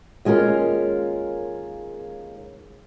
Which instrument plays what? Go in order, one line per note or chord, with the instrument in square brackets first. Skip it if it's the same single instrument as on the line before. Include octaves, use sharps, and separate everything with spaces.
[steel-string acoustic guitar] D#2 G#3 C#4 F4 A#4